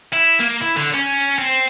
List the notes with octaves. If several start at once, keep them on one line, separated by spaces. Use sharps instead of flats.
E4
A#3
E4
D3
C#4
C4